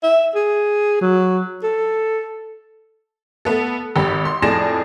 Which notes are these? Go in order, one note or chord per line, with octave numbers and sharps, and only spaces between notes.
E5
G#4
F#3
A4
A3 B3 A4
G#1 G4 B5
C6
F2 A2 G#4 D5 A#6 E7